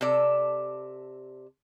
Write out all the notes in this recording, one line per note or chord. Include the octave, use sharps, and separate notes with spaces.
C3 A4 D5